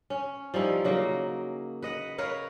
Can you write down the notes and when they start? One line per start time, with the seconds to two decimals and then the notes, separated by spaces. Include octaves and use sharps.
0.10 C#4
0.54 F3 G3 D#4 E4
0.84 C#3 F#3 A#3
1.82 B4 D#5 F#5
2.18 A#4 B4 C#5 F5